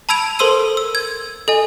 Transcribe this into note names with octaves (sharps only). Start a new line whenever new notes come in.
A5 B5 E6 G#6 D7 F7
A4 A#4 C5 C6 E6 D#7
E6
G#6
A4 D#5 G#5